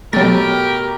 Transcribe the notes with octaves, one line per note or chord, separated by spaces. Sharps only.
B2 F#3 A3 G4 A#4 A6